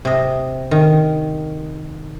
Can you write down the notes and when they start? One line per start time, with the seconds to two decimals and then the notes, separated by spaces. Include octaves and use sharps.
0.05 C3 D#5
0.71 D#3